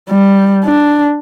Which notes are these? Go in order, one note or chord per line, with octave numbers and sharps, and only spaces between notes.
G3
D4